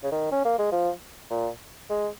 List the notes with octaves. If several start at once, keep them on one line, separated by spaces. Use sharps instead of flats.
C#3
D#3
C#4
A#3
G#3
F3
A#2
G#3